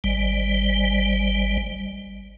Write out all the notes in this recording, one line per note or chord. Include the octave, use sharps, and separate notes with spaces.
G#1 G3